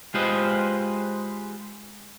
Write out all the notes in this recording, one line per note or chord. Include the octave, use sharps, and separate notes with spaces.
G#3 F4 G4 B4 C5 D#5